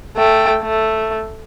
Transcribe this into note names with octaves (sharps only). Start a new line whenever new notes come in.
A3 G5
A3